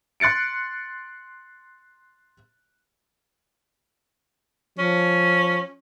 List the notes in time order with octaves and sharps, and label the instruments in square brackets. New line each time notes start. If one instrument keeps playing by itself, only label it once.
[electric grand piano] C6 F#6 A6 C#7 D7
[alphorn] F3 [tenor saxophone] C#4